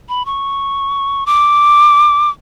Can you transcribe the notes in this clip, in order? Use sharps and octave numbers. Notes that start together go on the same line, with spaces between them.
B5
C#6
D6